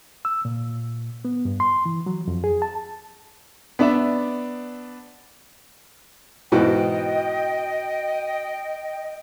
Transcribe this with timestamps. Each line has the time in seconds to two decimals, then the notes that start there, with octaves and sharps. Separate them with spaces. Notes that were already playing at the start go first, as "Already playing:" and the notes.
0.25 E6
0.45 A#2
1.25 B3
1.45 G2
1.60 C6
1.86 E3
2.06 F#3
2.28 F2
2.44 G#4
2.62 A5
3.79 B3 D4 D5 E5
6.52 G#2 B2 E3 D#5 G5